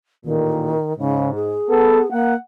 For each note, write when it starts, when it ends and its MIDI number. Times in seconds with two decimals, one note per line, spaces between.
0.25 0.73 33
0.25 0.73 46
0.25 0.96 51
0.98 1.54 44
0.98 1.33 49
1.35 2.11 68
1.69 2.00 59
1.69 2.00 69
2.11 2.34 58
2.11 2.35 78